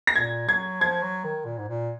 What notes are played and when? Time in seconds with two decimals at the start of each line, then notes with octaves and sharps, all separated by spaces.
0.07 A#6
0.15 A#2 G#6
0.48 F#3 G#6
0.81 F3 G#6
1.03 F#3
1.24 D#3
1.45 A#2
1.58 G#2
1.68 A#2